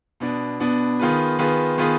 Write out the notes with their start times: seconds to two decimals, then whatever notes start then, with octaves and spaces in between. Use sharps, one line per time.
0.20 B2 B3 D4
0.60 B2 B3 D4
0.99 D#3 B3 F4 G#4 B4
1.39 D#3 B3 F4 G#4 B4
1.78 D#3 B3 F4 G#4 B4